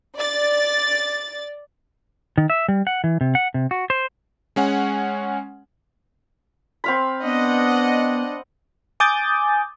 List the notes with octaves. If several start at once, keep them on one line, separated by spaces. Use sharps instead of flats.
D5 A6
D#3
E5
G3
F#5
E3
C3
F#5
C3
F#4
C5
G#3 C#4 F#5 G#5
C4 F5 B5
B3 D4 D#5 F#5
G#5 D6 D#6 G6 A6